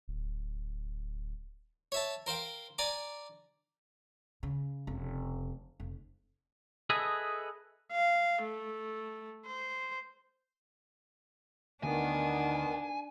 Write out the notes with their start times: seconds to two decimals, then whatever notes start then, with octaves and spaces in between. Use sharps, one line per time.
0.08 D1
1.92 C#5 E5 A5
2.26 A#4 C5 F5 G5
2.78 D5 G#5 A#5 D6
4.43 C#3
4.87 F1 C#3
5.80 F1
6.90 G#4 A4 B4 D#5 E5 G#5
7.92 F5
8.43 A3
9.46 C5
11.83 D2 D#3 B3 D4 G#5